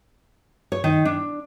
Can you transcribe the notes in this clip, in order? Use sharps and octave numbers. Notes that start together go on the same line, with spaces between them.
C#5
D#3
D4